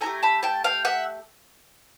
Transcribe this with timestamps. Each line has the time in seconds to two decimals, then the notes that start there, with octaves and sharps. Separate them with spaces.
0.01 A3 D4 G#5 A#5
0.06 G4
0.23 A5 B5
0.43 G5 A5
0.64 F5 G5
0.85 E5 F#5